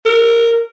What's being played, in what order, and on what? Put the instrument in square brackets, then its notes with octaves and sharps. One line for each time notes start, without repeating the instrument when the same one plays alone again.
[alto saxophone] A#4